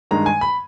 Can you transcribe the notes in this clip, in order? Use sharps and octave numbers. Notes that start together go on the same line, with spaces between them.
G2 D#3 G#3 A#5
G#5
B5